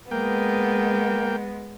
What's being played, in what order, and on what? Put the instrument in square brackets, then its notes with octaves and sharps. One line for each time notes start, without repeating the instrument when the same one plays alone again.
[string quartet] G#3 B3 [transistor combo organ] A#3 G5